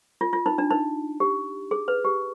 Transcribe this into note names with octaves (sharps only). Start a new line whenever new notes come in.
F4
F4
D#4
D4
D#4
G4
G#4
B4
G4